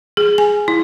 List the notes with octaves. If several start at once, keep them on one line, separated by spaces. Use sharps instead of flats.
G#4
G#5
E4